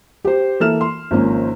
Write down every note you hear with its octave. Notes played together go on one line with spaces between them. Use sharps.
G4 C5
E3 A#3 A4 E5 F6 E7
C6
G#1 F3 A#3 C#4